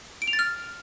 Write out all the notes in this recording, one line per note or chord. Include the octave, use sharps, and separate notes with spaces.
D7
F7
A6
F6